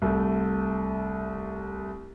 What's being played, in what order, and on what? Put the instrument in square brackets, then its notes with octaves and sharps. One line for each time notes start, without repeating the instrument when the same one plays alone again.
[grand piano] C2 A3